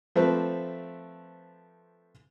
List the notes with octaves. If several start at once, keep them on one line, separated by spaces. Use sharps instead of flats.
F3 A3 C4 B4